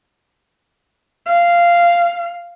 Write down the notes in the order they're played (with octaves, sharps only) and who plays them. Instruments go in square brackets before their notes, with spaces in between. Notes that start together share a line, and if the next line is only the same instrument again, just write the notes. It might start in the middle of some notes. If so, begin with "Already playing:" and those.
[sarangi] F5